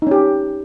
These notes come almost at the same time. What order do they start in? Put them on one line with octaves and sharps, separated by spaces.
D#4 C#4 G4